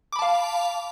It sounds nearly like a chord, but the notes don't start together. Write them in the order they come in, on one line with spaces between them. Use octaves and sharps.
D6 B5 A5 F5